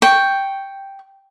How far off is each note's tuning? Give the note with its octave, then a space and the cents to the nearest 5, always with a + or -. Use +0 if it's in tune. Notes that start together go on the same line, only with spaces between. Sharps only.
G5 +0 C#6 +0